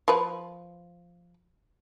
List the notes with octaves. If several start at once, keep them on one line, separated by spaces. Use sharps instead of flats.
F3 B4